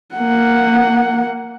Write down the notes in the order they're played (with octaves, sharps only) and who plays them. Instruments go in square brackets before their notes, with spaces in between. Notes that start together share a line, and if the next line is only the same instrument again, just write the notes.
[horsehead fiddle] A#3 F#5